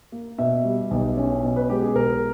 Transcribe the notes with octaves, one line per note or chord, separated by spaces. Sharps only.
A#3
B2 E5
G3
B1
C#4
B2
B4
G#3 G4
G#4
B1 A#4